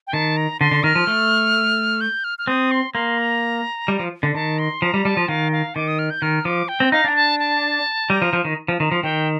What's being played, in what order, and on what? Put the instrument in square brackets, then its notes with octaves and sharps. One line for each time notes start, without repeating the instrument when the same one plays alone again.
[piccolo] G5
[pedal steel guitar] D#3 [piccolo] A5
[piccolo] A#5
[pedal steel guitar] D3 [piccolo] C6
[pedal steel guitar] D3
[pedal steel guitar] D#3 [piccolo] F6
[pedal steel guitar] F3
A3
[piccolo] G6
F6
F6
[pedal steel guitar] C4 [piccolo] D#6
[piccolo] C6
[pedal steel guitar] A#3 [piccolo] C6
[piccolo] A#5
[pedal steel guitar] G3
F3
D3
[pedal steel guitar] D#3 [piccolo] A5
[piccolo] C6
[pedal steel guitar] F3 [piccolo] A#5
[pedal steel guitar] G3
[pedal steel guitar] G3 [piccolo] A5
[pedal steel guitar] F3
[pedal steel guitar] D#3 [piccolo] F5
[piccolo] F5
[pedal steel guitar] D#3 [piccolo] D6
[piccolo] D#6
F6
G6
[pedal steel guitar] D#3 [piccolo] F6
[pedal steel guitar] F3 [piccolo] D6
[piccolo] G5
[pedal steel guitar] C4
[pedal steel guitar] D#4 [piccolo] F5
[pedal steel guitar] D4 [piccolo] A#5
[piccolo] A5
A5
[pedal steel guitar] G3 [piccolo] A#5
[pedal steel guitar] F3
F3
D#3
F3
D#3
F3
[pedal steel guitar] D#3 [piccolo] G5